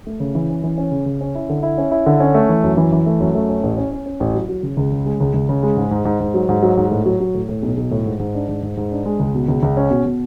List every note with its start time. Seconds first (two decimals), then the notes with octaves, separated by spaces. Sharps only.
0.07 A3
0.20 C#3
0.35 E3
0.50 C#4
0.63 E3
0.78 C#4
0.91 C#3
1.06 C#3
1.21 C#4
1.35 E4
1.49 D3
1.63 E4
1.78 C#4
1.91 E4
2.06 D3
2.20 C#4
2.35 A3
2.49 E3
2.63 F#2
2.77 E3
2.92 E3
3.06 A3
3.20 F#2
3.35 A3
3.49 C#4
3.63 A1
3.77 C#4
3.91 C#4
4.06 C#4
4.20 A1
4.35 F#3
4.49 F#3
4.63 C#3
4.77 C#2
4.92 C#3
5.06 G#3
5.21 C#2
5.34 C#2
5.49 C#3
5.63 G#3
5.77 G#2
5.91 G#2
6.05 G#2
6.20 G#2
6.34 F#3
6.49 G#2
6.62 F#3
6.77 G#2
6.91 A2
7.06 F#3
7.20 F#3
7.35 A2
7.49 A2
7.62 B1
7.77 B1
7.91 A2
8.06 G#2
8.20 G#2
8.35 D4
8.49 G#2
8.63 G#2
8.77 G#2
8.92 D4
9.06 G#3
9.20 C#2
9.35 B2
9.48 C#2
9.63 C#2
9.77 C#4
9.91 B2
10.06 B2